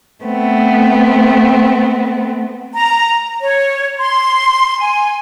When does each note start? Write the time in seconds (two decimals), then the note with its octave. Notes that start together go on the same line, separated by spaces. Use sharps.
0.24 A3 B3 C4
2.75 A#5
3.40 C#5
3.98 C6
4.79 G#5